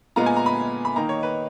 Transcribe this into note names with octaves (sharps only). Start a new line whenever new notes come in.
A#2 G#3 B3 F4 A#5
G#5
A#5
B5
B5
D#3 A#3 D#4 A#5
C#5
B4